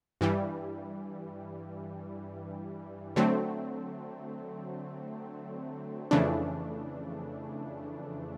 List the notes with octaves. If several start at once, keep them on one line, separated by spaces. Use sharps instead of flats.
G2 E3 G3
D3 F#3 A3 C4
F2 C#3 E3 A3 D4